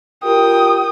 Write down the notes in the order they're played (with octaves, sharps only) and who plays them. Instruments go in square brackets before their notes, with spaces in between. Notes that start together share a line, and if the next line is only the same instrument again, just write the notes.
[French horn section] F4 G4 A#4 [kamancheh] G5 D#6